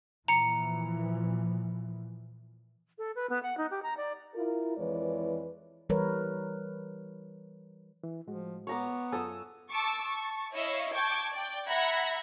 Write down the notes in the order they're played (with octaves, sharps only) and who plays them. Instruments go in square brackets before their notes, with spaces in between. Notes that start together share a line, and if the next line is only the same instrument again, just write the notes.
[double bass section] A#2 E3 F3 [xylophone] A#5 C#7
[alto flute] A4
B4
B3
F#5
D#4
G4
A#5
D5
[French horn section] E4 F4 A#4
F2 E3 G#3 B4 C#5 D5
[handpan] E3 G3 A#4 B4 C#5
[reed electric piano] E3
[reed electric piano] A2 G#3 F#4 [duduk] F3
[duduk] B3 [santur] C#5 A#5 D6
[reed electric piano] F#2 F4 G#5 [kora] A4 [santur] D#6 E6
[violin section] A5 C#6 D6 E6
A5 C#6
E4 C#5 D#5 F5 C#6 E6
G5 A5 C#6 D6 G6 G#6
D5 G5
E5 F#5 A#5 B5 G#6 A#6